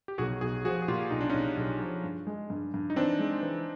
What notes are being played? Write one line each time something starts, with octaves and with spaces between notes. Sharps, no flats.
G4
B1 F#4 G#4
B1 F#4 G#4
F3 F#4 G#4
G#4
A#2 F4 G4
B1 D#4
D4
B1 C#4 D#4
B1
F3
G2
G#3
G2
G2
D#4
E3 C4 D4
G#3
E3